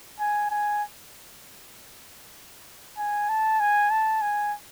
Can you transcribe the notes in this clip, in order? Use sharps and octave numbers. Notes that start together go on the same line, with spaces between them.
G#5
G#5
G#5
A5
G#5
A5
G#5